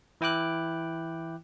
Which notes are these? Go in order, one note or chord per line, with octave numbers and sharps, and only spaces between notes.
E3 E4 G5 D6 F#6